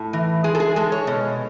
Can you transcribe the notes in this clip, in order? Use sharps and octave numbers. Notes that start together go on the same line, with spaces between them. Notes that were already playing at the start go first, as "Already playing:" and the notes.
Already playing: A2
E3
G#3 G#4
A4
G#4
G#3 A4
C#5
B2